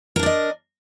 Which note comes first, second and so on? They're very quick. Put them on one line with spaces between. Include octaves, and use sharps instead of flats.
A#4 D4 D5 D#5